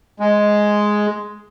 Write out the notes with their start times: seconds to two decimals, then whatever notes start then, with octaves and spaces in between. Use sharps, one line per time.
0.20 G#3